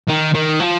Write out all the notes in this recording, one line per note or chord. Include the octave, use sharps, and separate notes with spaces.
D#3
D#3
F3